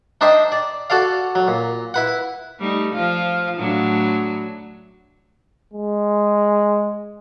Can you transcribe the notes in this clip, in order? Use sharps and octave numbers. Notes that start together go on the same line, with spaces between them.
D4 D#4 C5 E5 G5
D5
F#4 A4 D5 F5
F#3
A#2
E4 B4 F#5
G3 A3 D#4
F3 F4
A2 F#3 D4
G#3